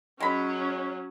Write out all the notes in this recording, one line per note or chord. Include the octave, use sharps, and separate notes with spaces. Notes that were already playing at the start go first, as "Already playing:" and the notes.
F#3 G#3 C#4 C#5 B5